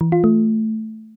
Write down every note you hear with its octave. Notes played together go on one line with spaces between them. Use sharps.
E3
F4
A3